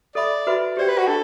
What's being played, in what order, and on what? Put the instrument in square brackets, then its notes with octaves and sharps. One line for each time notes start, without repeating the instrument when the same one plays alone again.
[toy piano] A4 E5 B5 [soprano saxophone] D5
[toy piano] F#4 B4 E5 B5
[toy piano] G4 D5 G5 [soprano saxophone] C5
[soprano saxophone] B4
F#4
[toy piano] D4 [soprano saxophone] A4